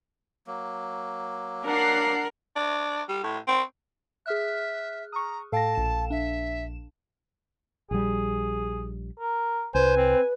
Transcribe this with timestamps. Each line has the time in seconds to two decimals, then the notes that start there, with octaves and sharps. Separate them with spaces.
0.47 F#3 A#3
1.65 D4 A#4 F#5 C7
2.56 D4
3.08 G3
3.23 A2
3.47 C4
4.26 G#4 E5 F6 F#6
5.12 A#5 C#6 D#6
5.52 A2 A4 F5 G5 A5 A#6
5.75 A#1 E7
6.10 D4 E5
7.91 A#1 G3 G#4
9.19 A#4
9.75 C2 B4 C5 G#5
9.96 C4